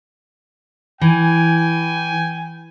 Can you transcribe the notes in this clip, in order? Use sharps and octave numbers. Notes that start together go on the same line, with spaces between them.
E3 G5 G#5